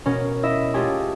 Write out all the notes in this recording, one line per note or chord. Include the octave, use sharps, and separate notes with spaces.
B2 C#4 A#4
E4 D#5 E5
G#3 A3 C#4 F4 G4 G#4